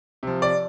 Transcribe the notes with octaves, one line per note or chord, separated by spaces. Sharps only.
C3 F3
D5